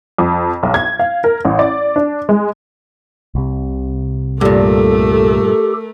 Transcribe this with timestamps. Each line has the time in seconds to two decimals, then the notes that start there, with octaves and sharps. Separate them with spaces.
0.18 F2
0.63 B1
0.74 G#6
0.99 F5
1.24 A#4
1.45 A1
1.59 D5
1.96 D4
2.29 G#3
3.35 C2 C3
4.41 G2 A#2 A3 G4 A4 A#4